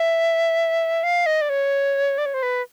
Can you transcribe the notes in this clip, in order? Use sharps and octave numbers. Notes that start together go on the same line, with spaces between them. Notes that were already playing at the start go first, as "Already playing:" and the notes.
Already playing: E5
F5
D#5
D5
C#5
D5
C#5
C5
B4